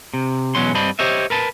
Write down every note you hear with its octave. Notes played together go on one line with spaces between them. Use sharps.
C3
E2 B2 F#3 G#3 C#4 C6
G2 C4 D4 D#5 B5
G4 C5 C#5 D#5 E5
A#4 B4 A5